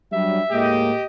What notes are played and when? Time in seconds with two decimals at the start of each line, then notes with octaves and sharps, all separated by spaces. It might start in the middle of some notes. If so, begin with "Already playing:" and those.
0.13 F#3 G3 D4 E5
0.52 A2 G#3 A#3 G4 D#5